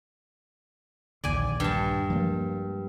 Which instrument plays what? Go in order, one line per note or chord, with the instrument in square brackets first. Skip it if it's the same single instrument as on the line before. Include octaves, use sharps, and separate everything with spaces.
[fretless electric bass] A#1 D#2 D3 [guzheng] D5 G#5
[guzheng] G2 A5
[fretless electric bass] F3 G#3 A#3